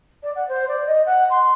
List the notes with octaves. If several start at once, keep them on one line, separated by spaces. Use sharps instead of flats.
D5
F#5
C5
D5
D#5
F#5
C6